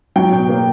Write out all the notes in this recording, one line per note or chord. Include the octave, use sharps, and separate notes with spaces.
F#3 G5
B2
A#3